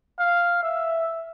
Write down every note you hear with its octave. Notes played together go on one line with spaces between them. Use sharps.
F5
E5